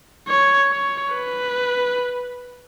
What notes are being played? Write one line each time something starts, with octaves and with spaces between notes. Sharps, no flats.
C#5
C#5
B4